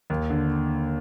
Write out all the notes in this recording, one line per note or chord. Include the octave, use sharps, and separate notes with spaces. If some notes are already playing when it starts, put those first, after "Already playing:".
D#2
D3